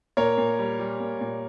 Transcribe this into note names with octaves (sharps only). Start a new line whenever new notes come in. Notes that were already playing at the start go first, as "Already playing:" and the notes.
A#2 A#4 C#5
A#2
G3
G3
A#2
A#2